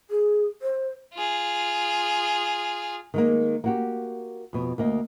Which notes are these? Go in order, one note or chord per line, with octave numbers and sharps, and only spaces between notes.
G#4
C5
F4 G#4
D#3 G#3 A#3
A#3 F#4 G4
F2 B2
D2 A#3 D#5